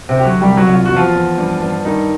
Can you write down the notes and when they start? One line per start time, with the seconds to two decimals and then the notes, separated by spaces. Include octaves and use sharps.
0.09 C3 C4
0.17 D2 G4
0.24 F#3 F#4
0.41 C2 G3 G4
0.57 F#3 F#4
0.65 C2
0.73 F4
0.85 E2 F#4
0.96 F3 F4
1.14 E2
1.38 G2
1.61 G2
1.85 G2 D#3 D#4